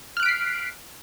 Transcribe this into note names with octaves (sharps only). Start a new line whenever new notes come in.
F6 F#6 B6 C7 D7